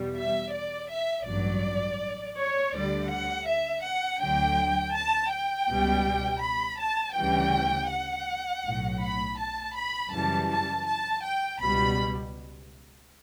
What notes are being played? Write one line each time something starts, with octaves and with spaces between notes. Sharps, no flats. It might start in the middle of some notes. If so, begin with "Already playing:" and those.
Already playing: E2 B2 G3
E5
D5
E5
A1 G2 F#3 D5
C#5
D2 D3 G3 D5
F#5
E5
F#5
D2 D3 F#3 G5
A5
G5
C#2 B2 G3
B5
A5
D2 C#3 E3 G3 G5
F#5
B1 A2 F#3
B5
A5
B5
F#2 C#3 E3 G3 A5
A5
A5
G5
C#2 B2 G3 B5